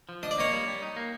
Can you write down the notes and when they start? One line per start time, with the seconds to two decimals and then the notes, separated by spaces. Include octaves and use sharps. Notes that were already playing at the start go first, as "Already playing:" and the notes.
0.09 F3
0.23 D4 D#5
0.31 D5
0.38 A#3 C#5 D#5
0.53 G3
0.68 G3
0.82 D#4
0.96 A#3